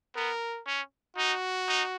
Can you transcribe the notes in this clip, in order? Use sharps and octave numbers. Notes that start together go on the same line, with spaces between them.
B3 A#4
C#4
D#4 F#4
D#4